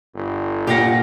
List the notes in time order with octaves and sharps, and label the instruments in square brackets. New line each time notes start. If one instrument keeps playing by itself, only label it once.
[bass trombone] G1
[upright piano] A#2 A#6 [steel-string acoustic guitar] G4 F5 F#5